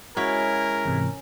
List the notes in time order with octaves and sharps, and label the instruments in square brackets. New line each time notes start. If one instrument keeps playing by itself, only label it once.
[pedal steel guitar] G#3 E4 [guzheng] C#4 [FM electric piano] F#4 [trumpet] A#4
[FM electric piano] G#2 C3 E3